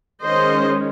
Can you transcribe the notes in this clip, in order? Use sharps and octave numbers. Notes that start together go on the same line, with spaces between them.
D#3 G#3 C#4 C5 D#5